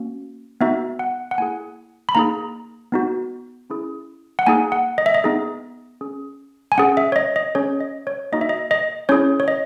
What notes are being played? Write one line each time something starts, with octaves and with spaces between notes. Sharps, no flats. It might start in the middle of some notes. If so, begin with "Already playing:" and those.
Already playing: A#3 C#4 F#4
B3 D#4 F#4 E5
F#5
F#5
A#3 E4 G#4 G#5
B5
A#3 D#4 G#4 A#5
B3 D#4 F#4
C#4 E4 G#4
F#5
A#3 D#4 G#4 G#5
F#5
D#5
E5
D#5
B3 D#4 G#4
C#4 G#4
G#5
C#4 G#4 F#5
E5
C#5
D#5
D#5
C#4 G#4 C#5
D#5
C#5
A#3 D#4 F#4 D#5
E5
D#5
D#5
C#4 E4 G#4 C#5
C#5
D#5